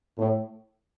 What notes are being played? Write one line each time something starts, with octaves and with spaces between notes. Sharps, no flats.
A2